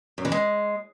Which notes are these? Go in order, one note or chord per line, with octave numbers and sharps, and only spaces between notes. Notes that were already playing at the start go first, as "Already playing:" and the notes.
F#2
E3
G#3